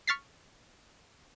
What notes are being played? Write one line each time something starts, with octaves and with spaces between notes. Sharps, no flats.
C#6 F6 A6 B6 C7